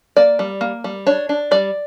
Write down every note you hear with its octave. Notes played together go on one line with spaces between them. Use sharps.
A#3 D5
G3
A#3
G3
D4 C#5
D4
G3 D5